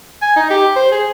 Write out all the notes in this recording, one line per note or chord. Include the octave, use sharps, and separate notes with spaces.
G#5
D#4
G4
C5
G#4